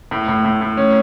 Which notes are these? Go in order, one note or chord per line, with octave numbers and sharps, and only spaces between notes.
A2
A2
A2
A2
C#4